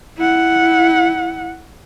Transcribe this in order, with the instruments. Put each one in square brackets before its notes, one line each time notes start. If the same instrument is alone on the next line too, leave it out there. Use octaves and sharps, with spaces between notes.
[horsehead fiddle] E4 F#5